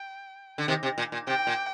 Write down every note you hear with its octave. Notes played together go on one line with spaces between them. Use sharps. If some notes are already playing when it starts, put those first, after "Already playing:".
Already playing: G5
D3
C3 D#3
C3
A#2
A#2
C3 G5
A#2